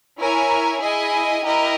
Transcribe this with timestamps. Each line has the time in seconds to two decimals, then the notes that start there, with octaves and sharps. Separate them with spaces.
0.20 E4 A#4 C#5 G#5
0.82 E4 G#4 D#5 G#5
1.46 E4 G4 A#4 D#5